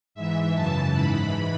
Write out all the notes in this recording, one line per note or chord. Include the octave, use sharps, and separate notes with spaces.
G#2 E3 E5
F#2 C#3 E3 A5
G#2 E3 B5